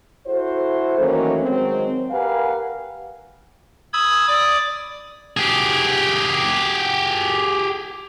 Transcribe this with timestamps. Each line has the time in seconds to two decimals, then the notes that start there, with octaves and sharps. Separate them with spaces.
0.27 E4 F#4 A4 C5
0.99 D#3 E3 F#3 A3 A#3 C#4
1.43 D#3 F#3 G#3 C4
2.11 G4 A#4 B4 F5 F#5 G#5
3.93 B5 D#6 E6 G#6
4.28 D5 D6 D#6
5.37 G4 G#4